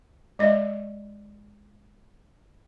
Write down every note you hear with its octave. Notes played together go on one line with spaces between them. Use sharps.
G#3 D#5 E5